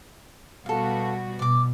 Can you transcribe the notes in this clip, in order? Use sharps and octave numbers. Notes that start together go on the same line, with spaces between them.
B2 G3 F#4 A4 F5
B2 D5 D6